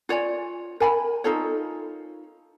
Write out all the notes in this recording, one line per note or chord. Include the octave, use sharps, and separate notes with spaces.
F4 C#5 D5 G#5
A#4 G#5 A5 B5
D#4 F4 A4 C#5